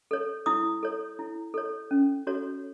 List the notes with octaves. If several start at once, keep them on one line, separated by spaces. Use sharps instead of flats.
A4 C#5
E4 D#6
A4 C#5
E4
A4 C#5
C#4
F#4 A4 C#5